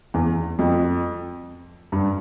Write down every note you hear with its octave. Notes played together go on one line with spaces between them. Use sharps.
E2
F2
G2